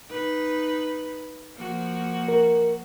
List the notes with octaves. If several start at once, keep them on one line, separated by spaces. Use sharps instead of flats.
D#4 B4
F3 A#3 F#4
A#4